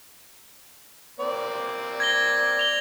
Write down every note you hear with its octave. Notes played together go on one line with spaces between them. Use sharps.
A#3 C4 D5
G#6 A#6 G7
F7 G7